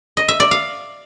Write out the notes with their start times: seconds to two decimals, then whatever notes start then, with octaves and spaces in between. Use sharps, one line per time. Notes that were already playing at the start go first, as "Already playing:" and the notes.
0.17 D#5
0.28 E5
0.40 D5
0.51 F5